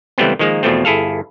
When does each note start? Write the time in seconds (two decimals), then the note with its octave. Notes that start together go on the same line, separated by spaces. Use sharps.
0.18 C#2 E3 G3 A3 B3 C4
0.39 D#3 F3 G#3 A#3
0.63 E2 B2 F3 A3 C4
0.85 G1 E4 G#4 A4 F5